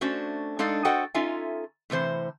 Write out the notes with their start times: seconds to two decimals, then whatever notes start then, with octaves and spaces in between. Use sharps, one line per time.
0.01 A3 C#4 D4 F#4 C5
0.59 G#3 D4 D#4 A4 D5 F5
0.85 F#4 A4 C5 D#5 F#5 G5
1.14 C#4 D#4 F4 A4 E5 G#5
1.90 A2 C3 E3 C5